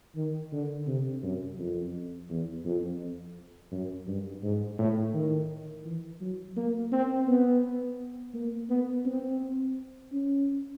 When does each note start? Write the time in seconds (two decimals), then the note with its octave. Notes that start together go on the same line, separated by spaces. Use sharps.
0.16 D#3
0.52 D3
0.87 C3
1.23 F#2
1.58 F2
2.30 E2
2.65 F2
3.72 F#2
4.07 G2
4.43 G#2
4.78 A2
5.14 D#3
5.85 E3
6.21 F#3
6.56 A#3
6.92 C4
7.27 B3
8.34 A#3
8.69 B3
9.05 C4
10.12 C#4